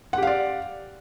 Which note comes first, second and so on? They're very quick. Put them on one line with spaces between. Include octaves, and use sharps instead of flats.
F#5 G4 F5 D5